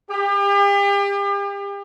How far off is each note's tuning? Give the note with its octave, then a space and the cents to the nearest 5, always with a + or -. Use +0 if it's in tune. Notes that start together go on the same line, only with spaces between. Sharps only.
G4 +40